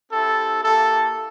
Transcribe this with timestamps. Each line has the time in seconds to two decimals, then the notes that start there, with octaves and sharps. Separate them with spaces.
0.10 C4 E4 G4 A4
0.62 A#3 E4 G4 A4